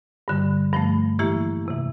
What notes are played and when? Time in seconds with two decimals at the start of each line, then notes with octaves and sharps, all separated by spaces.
0.28 G2 D3 G3
0.73 G2 F3 A3
1.19 A2 E3 A#3 E4 G4
1.66 F2 C3 E3